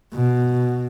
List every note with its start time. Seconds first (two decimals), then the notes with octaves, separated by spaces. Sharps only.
0.13 B2